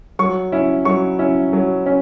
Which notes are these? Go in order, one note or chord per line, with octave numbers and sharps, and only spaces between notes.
F#3 C#6
C#4 E4
F#3 C#6
C#4 E4
F#3
C#4